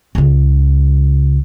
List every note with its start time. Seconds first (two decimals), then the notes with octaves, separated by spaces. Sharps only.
0.15 C#2 C#3